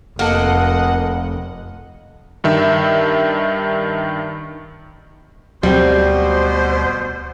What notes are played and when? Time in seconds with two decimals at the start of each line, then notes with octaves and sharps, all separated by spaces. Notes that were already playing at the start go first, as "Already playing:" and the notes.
0.19 F1 A#3 A4 D#5 F#5
2.44 G2 D#3 E5
5.63 D2 B2 F#3 G3 C4 C5